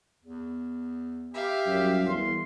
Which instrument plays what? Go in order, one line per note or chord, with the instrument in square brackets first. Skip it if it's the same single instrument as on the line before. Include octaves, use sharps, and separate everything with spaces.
[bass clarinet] E2
[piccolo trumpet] G4 [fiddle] E5 F5
[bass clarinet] C2 [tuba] F#2
[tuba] E2 [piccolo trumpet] C6